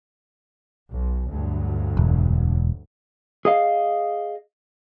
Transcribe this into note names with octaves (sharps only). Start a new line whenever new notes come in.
B1
D2 G2 F#3
E1
G#4 D#5 F5